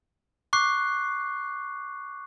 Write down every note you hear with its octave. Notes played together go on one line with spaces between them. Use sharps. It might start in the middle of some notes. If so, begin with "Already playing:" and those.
C#6 D6 F#6 C7